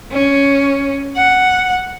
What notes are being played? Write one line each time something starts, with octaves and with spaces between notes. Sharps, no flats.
C#4
F#5